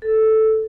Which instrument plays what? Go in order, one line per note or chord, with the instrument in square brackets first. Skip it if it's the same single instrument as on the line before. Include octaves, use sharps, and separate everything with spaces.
[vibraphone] A4